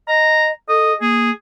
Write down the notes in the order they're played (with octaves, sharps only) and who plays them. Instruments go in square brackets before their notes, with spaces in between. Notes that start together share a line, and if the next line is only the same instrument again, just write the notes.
[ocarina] D#5 [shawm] A#5
[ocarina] A4 [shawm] D#5
[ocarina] A#3 [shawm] G#4